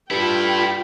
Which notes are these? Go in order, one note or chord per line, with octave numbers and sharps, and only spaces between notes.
G2 E4 F4 A4 G5 B5